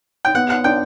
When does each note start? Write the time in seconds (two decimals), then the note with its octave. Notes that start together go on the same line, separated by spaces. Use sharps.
0.25 G5
0.35 B3 F#5
0.50 F#5
0.64 D4 G5